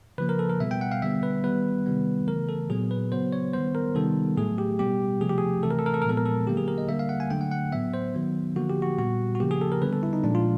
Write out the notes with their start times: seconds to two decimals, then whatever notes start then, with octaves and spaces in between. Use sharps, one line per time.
0.18 C#3 F3 A#3 B4
0.29 A#4
0.39 A4
0.50 A#4
0.60 B2 G3 B3 E5
0.71 G5
0.81 F#5
0.92 F5
1.02 D3 G3 B3 E5
1.23 B4
1.44 D#3 G3 B3 B4
1.86 C3 D#3 G3 B3
2.28 C#3 E3 A3 A#4
2.49 A4
2.70 A#2 F#3 B3 G#4
2.91 B4
3.12 C#3 F#3 B3 C5
3.33 C#5
3.53 D#3 G3 B3 C5
3.75 A#4
3.95 C3 D#3 G3 B3 A4
4.37 A2 F#3 A3 G#4
4.58 G4
4.79 B2 G3 B3 G4
5.21 C3 F3 A3 G#4
5.29 G4
5.38 G#4
5.63 C3 E3 A3 A4
5.71 A#4
5.79 A4
5.86 A#4
5.94 A4
6.02 A#4
6.05 A#2 F3 G#3 B3 A4
6.17 A#4
6.26 A4
6.47 D3 F#3 A#3 G4
6.57 G#4
6.68 A#4
6.78 D#5
6.89 D3 G3 A#3 E5
6.99 F5
7.09 F#5
7.20 G#5
7.30 D3 F#3 A3 G5
7.41 F#5
7.51 F#5
7.72 A2 F#3 B3 E5
7.94 C5
8.14 D#3 F#3 B3
8.56 D3 F3 A#3 F#4
8.70 G4
8.82 F#4
8.98 A#2 G3 B3 F#4
9.35 F#4
9.40 C#3 F3 A#3 G4
9.51 G#4
9.61 A4
9.72 A#4
9.82 D3 G3 B3 B4
9.93 A4
10.03 E4
10.13 D#4
10.24 A#2 F3 G#3 D4
10.35 F4